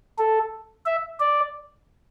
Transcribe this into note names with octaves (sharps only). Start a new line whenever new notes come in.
A4
E5
D5